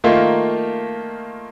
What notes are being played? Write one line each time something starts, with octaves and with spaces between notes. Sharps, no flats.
D#3 A3 A#3 F4